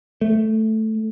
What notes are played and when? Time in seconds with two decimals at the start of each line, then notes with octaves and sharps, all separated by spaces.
0.21 A3